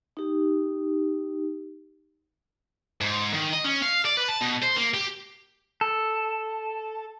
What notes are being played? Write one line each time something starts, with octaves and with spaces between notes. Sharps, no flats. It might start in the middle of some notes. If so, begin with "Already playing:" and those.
D#4 G4
G#2
D#3
D#5
C#4
F5
D5
B4
A5
B2
C5
A#3
G4
A4